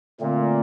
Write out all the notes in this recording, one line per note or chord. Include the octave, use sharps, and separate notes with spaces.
A#2 D3 A3 C4